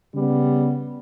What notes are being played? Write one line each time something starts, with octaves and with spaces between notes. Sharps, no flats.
C#3 G3 B3